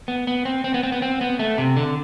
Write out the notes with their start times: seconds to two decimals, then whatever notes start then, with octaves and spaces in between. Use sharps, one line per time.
0.08 B3
0.27 B3
0.45 C4
0.64 C4
0.74 B3
0.83 C4
0.92 B3
1.02 C4
1.21 B3
1.39 A3
1.58 C3
1.77 D3